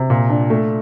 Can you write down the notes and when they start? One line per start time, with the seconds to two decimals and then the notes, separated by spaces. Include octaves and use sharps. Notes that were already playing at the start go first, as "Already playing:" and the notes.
Already playing: C3
0.10 A#2
0.30 D4
0.50 A3